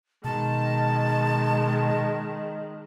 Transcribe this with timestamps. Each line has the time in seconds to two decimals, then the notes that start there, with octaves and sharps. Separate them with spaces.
0.24 B2 D#3 G#3 A5